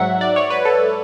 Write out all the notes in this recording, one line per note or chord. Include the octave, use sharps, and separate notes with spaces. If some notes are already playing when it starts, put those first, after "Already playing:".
Already playing: G#2 F#3 E5 F#5
D5
C#5
B4
A4